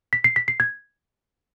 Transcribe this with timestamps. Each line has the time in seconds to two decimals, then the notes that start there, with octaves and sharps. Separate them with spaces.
0.13 B6
0.24 C7
0.36 B6
0.48 C7
0.60 G#6